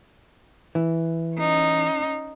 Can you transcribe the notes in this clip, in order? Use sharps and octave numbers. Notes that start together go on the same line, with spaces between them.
E3
C#4 D#4